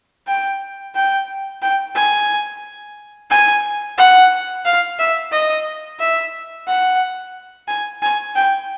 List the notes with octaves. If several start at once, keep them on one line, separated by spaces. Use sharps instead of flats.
G5
G5
G5
G#5
G#5
F#5
F5
E5
D#5
E5
F#5
G#5
G#5
G5